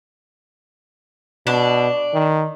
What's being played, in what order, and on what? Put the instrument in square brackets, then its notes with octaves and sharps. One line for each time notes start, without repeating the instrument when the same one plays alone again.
[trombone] B2 [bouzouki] D4
[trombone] D#3